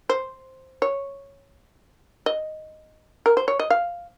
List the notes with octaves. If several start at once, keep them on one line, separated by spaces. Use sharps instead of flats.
C5
C#5
D#5
A#4
C5
C#5
D#5
F5